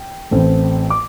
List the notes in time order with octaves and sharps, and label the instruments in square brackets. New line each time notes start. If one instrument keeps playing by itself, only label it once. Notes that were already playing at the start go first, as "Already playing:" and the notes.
Already playing: [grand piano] G5
A1 A2 A3 C4
D6